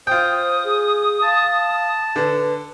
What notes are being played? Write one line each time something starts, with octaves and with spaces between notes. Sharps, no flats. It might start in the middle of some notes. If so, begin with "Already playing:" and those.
F4 C5 G5 D#6
G#4
F5 A5
D3 B4